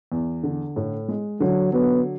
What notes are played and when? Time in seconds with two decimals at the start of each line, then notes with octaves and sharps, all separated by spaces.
0.12 E2
0.43 D3
0.76 A2
1.08 G#3
1.40 D3 F#3
1.72 F#3 B3